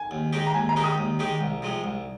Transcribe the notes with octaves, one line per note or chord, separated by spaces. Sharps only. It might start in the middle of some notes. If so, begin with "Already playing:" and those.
Already playing: G#5
D#2
D#3 G#3 D#4 G4
A#5
D#2 G#5
A#5
D#3 G#3 D#4 G4
D#6
D#2
D#3 G#3 D#4 G4
C2
C3 F3 G#3
C2